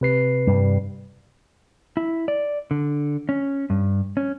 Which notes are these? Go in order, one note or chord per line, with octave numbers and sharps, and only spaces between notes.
C3 B4 C7
G2 G3
E4
D5
D3
C#4
G2
C#4